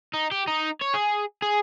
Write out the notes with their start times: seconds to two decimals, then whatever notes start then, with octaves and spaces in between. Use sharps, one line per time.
0.13 D#4
0.31 G4
0.47 D#4
0.82 C#5
0.94 G#4
1.42 G#4